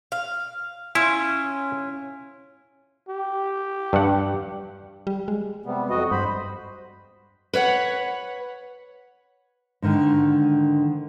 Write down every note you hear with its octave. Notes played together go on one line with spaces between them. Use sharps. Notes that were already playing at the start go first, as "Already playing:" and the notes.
F5
C#4 E4 F4
G4
G2 F#5
G3
G#3
C3 G3 B3
F2 F#4 D#5
G2 C5 B5
B4 C#5 F5 F#5
G#2 D3 D#3